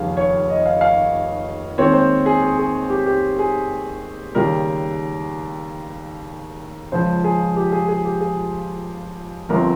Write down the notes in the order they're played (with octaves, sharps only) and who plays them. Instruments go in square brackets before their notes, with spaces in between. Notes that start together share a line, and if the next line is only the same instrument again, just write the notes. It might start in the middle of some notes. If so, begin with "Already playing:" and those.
Already playing: [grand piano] F1 D#2 C#3 G3 F5
C#5
D#5
F5
F5
D#2 D#3 G#3 C4 C#5
C5
G#4
G#4
G#4
G4
G4
G#4
D#2 C#3 G3 A#4
C#2 C#3 F3 C5
G#4
G4
G#4
G#4
G4
G#4
G1 G2 F3 C4 A#4